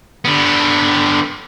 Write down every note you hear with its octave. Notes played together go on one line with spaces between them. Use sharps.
D3 B3